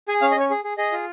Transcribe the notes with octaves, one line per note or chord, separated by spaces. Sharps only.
G#4 G#5
C#4 F5
D#5
C#4 C#5
G#4
G#4
G#4 D#5
F4